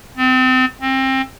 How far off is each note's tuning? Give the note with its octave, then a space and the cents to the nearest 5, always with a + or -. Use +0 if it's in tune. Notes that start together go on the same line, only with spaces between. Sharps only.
C4 -30
C4 +25